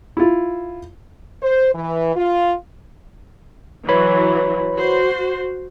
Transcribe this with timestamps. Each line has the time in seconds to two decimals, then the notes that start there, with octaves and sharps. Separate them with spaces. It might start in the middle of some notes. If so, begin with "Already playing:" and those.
0.17 E4 F4
1.42 C5
1.73 E3
2.15 F4
3.89 E3 F#3 B4 C#5 B5
4.74 F#4 C5